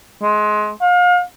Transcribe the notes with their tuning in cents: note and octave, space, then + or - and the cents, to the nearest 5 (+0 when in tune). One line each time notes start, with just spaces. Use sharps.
G#3 +25
F5 +35